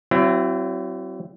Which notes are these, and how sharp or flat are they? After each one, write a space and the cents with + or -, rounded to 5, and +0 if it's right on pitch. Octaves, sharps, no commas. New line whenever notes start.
F#3 +40 C4 +0 E4 +35